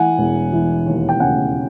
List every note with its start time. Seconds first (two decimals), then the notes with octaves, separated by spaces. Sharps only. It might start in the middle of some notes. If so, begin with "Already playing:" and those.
Already playing: E3 F#5 G#5
0.18 E1
0.53 E3
0.86 D#2
1.09 G5
1.20 C#3 F#5 G#5